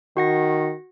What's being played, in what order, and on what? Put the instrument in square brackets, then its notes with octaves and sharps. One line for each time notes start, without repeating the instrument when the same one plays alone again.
[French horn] D#3 [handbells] F#4 F#5 A#6